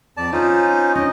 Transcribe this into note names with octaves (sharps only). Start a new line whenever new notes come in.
F2 D5 A5
C#4 D#4 F4 C5
C#4 D4 D#5